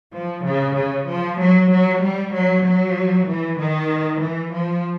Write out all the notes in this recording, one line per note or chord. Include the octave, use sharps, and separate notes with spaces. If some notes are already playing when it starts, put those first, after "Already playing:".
F3
C#3
C#3
F3
F#3
F#3
G3
F#3
F#3
E3
D#3
E3
F3